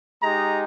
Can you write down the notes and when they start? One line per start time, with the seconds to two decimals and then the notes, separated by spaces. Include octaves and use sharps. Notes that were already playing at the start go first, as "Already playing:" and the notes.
0.22 G#3 D#4 G4 A#5